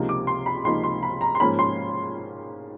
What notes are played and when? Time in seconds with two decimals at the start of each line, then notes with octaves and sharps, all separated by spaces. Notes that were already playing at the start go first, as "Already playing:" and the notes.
Already playing: C#2 C3 F3 A#3 D#4
0.09 D6
0.27 C6
0.46 B5
0.64 C#2 C3 F3 A#3 D#4 C6
0.84 C6
1.03 B5
1.21 A#5
1.35 C6
1.40 G#2 F3 A#3 C#4 B5
1.59 C6